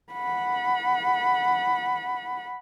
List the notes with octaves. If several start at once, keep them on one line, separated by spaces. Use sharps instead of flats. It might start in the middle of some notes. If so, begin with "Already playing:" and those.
F#5 B5